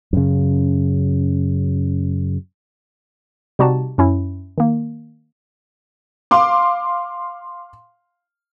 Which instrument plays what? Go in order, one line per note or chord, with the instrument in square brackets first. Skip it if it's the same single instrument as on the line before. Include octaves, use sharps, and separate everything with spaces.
[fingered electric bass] F#2 C#3
[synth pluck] C3 G3 D#4 F#4 G4 A5
F#2 C#4 E4
D#3 A#3
[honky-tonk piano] F5 C6 D6